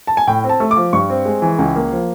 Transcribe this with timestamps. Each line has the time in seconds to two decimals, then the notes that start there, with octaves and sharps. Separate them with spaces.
0.07 A5
0.17 G#5
0.27 A2 G5
0.44 C4
0.49 A5
0.60 A3
0.71 D6
0.77 F3
0.93 G2 C#6
1.10 C4
1.25 G#3
1.42 E3
1.59 C#2
1.76 A#3
1.91 F3